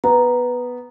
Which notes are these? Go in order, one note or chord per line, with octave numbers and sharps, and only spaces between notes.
B3 A#5